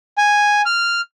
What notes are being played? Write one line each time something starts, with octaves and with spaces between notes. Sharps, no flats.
G#5
F6